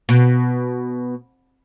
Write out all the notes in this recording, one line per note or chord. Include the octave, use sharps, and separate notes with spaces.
B2